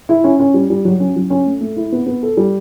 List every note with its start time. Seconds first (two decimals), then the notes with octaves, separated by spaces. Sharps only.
0.09 E4
0.24 C#4
0.40 C#4
0.54 G3
0.70 G3
0.85 F#3
1.00 C#4
1.16 F#3
1.30 C#4
1.46 A3
1.61 A3
1.76 E4
1.92 B3
2.06 B3
2.23 A4
2.37 G3